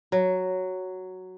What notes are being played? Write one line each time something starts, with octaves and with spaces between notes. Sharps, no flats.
F#3